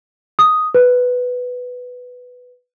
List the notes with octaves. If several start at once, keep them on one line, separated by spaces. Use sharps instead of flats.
D#6
B4